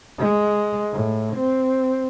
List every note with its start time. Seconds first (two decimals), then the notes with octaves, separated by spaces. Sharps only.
0.19 G#3
0.92 A2
1.36 C4